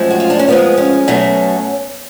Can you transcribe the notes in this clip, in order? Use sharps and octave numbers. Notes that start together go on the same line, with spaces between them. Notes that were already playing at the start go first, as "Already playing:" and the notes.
Already playing: F#2 F3 G#3 A3
F#4
F4
D4
C#4
F2 F3 G#3 B3
C#4
B2 F#3 A3